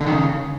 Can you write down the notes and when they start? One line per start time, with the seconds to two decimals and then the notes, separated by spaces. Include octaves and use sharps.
0.01 D3
0.06 D#3
0.12 C#3